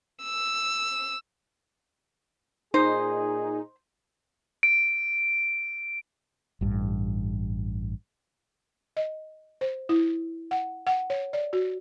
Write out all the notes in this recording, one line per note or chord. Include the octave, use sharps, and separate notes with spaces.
E6
A#2 D#4 G#4 C5
D7
A1 G2
D#5
C5
E4
F#5
F#5
C#5
D5
F#4